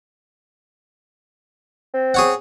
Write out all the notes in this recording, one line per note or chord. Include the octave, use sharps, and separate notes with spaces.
C4
G#4 C#5 F#5